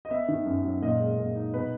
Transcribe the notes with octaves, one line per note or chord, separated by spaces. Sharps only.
D#5
B3 E5
D#3
F#2
F#3
A#2 D#5
G#3
A#2
D#4
B2 B4